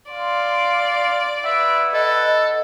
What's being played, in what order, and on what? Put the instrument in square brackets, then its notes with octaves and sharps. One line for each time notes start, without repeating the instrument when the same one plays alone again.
[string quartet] D5 [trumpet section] F5 C6
[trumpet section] E4 B4 F#5 [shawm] E5
[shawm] A4 [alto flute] D#5